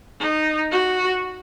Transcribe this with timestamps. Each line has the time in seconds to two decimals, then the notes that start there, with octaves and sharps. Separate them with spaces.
0.20 D#4
0.72 F#4